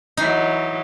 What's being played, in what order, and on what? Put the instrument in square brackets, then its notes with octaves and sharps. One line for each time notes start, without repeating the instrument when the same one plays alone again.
[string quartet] E3 F#3 [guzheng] D#4